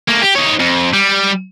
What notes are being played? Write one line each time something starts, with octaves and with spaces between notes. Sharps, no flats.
A3 A#3
G4
D#4 C#5
F2
G3